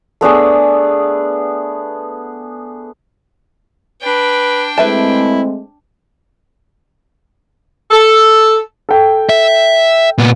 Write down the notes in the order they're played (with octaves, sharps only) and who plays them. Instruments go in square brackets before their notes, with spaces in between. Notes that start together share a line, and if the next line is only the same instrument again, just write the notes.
[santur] A3 B3 D4 G#4
[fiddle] D4 G5 [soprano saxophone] B4
[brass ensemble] G#3 A3 C4 [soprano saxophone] E4 [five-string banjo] B4 E5 A5
[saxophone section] A4
[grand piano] A4 G5
[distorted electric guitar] E5
A#2 B3